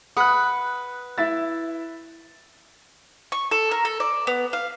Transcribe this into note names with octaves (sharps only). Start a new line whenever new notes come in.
B4 F#5 D#6 F#6
E4 E5 A6
C#6
A4
A#4
A4
D5
B3
F5